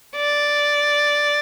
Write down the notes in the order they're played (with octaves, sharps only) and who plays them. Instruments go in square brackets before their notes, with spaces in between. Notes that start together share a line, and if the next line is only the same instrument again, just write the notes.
[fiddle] D5